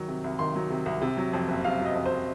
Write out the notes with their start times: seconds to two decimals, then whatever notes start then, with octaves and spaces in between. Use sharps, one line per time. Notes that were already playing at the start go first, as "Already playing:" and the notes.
Already playing: D#3 F#3
0.08 C3
0.24 C2
0.39 D#3 C6
0.55 F#3
0.70 C3
0.86 C2
1.02 C3
1.17 F#3
1.33 F2
1.48 F#1
1.64 C3 F5
1.80 F#3
1.85 D#5
1.95 F2
2.06 C5